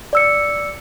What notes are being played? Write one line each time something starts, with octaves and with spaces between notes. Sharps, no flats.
D5 E6 C#7